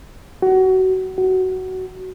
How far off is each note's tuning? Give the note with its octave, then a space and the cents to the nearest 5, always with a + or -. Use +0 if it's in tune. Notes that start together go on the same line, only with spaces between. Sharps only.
F#4 +25
F#4 +15